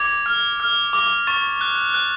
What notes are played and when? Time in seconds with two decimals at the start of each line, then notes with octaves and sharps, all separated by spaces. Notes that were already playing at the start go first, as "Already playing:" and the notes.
Already playing: D6 G#6
0.26 F6
0.60 F6
0.93 D6
1.27 C#6 A6
1.61 F#6
1.94 F#6